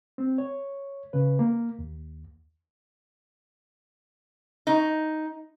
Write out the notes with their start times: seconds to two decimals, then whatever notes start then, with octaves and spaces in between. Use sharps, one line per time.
0.18 C4
0.38 C#5
1.13 C#3 B4
1.39 A#3
1.79 D#2
4.67 D#4